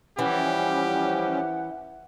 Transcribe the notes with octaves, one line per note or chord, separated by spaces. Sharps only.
E3 F3 G3 C#4 G4 F#5